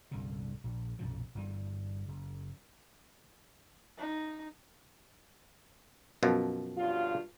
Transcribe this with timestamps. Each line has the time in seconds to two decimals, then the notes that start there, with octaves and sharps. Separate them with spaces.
0.11 G1 C2 A#2 D3
0.64 A#1
0.99 B1 F#2 A#2 F3
1.35 G1 G2 E3 G3
2.08 F#1
3.97 D#4
6.23 F#2 B2 F3
6.76 G2 F#3 F4